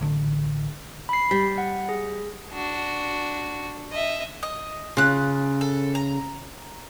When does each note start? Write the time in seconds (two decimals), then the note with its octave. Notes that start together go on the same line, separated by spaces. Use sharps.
0.01 A1 D3
1.09 B5 C7
1.31 G3 B6
1.58 F#5
1.89 G#4
2.52 D4 F#4
3.92 D#5 E5
4.43 D#5 D#6
4.97 C#3 F4 F#6
5.61 A4
5.95 A#5